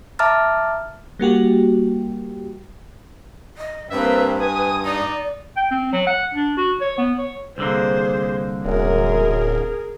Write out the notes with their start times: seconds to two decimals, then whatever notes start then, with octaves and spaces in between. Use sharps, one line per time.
0.19 E5 A5 A#5 D6 F6 A6
1.19 G3 A#3 F#4 G4
3.57 D#5
3.90 G2 A#3 C4 B4 E5
4.41 G#5 D#6
4.85 D#4 D5
5.57 G5
5.71 C4
5.93 F#3
6.07 F#5
6.34 D4
6.57 F#4
6.81 C#5
6.98 B3
7.18 C#5
7.58 C2 D3 A#3 G#4 C5
8.65 D1 F#2 G#4 A#4